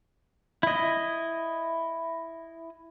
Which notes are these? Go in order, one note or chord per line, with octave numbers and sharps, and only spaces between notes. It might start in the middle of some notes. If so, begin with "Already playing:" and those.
E4 D#5